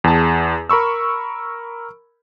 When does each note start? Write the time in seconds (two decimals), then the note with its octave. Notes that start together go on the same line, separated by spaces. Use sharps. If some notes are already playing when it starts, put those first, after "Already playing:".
0.04 E2 G#4 A5
0.69 A#4 B5 C#6 E6